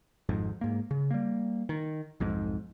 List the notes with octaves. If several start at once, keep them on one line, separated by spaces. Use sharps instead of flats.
G#1 F2 G#2
G#2 A#3
C#3
G3 A#3
D#3
B1 F2 G#2